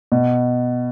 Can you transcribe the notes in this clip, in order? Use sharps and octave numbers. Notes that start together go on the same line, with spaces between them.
B2